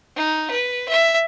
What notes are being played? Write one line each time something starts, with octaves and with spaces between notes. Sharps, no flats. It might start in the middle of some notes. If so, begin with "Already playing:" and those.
D#4
B4
E5